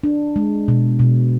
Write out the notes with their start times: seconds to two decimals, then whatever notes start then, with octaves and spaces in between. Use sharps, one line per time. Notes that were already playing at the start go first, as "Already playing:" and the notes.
0.04 D4
0.36 G#3
0.68 B2
0.99 B2